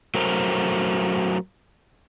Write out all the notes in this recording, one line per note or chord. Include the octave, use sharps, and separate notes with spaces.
F#3 A3 A#4 C5